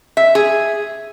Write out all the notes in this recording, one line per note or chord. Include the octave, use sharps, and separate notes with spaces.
E5
G#4